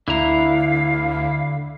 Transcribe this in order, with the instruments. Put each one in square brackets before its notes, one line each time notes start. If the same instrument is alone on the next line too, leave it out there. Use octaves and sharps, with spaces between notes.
[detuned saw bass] D2 [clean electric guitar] D3 A#5 [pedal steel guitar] E4 [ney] F5